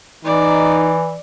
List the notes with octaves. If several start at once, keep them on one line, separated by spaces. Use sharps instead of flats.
E3 D#4 D5